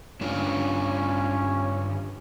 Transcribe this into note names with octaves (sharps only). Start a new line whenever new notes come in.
G2 C#4 D4 F4